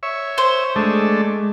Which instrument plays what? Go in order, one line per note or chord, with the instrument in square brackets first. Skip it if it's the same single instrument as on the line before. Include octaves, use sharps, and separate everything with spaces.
[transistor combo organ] C#5 E5
[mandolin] C5
[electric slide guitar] G#3 [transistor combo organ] A3 D4